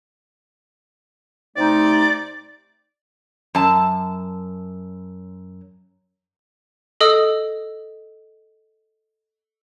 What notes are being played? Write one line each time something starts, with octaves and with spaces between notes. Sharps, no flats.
C3 A3 D#4 D5
F#2 A5
A4 D#5 D#6 E6